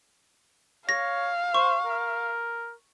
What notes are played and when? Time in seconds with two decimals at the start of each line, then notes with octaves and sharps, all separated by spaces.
0.89 C#5 F5 A#6
1.54 C5 C#6
1.86 A#4